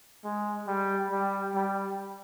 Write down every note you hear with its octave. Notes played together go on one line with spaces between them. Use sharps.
G#3
G3
G3
G3